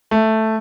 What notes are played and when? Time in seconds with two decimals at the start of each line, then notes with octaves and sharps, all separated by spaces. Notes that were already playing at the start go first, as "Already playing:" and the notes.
0.11 A3